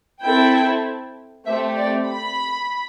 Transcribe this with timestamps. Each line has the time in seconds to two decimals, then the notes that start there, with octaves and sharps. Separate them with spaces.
0.22 C4 E4 A4 G5
1.45 A3 C4 G4 E5
1.76 D5
2.08 B5